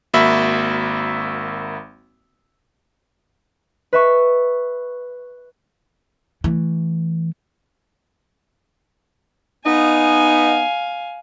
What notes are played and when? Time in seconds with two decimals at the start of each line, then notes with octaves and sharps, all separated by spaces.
0.14 G#1 A#3 F#4 E5 B5
3.93 B4 E5 C#6
6.44 E3 A3
9.65 B3 D#4 F5 G#5